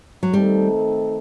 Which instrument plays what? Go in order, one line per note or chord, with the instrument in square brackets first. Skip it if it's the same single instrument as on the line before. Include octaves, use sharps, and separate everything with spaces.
[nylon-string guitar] F#3
[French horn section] D#3 A3 C4 D#4 A4 [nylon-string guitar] G3